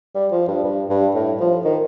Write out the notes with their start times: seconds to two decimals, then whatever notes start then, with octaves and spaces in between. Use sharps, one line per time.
0.15 G3
0.32 F3
0.48 G2
0.64 G2
0.89 G2
1.15 A2
1.40 F3
1.65 D#3